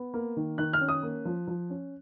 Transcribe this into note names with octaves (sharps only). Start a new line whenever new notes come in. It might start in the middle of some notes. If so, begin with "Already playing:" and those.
Already playing: B3
A#3
D#3
D#3 F#6
F6
C#4
D#6
A#3
F3
F3
C#4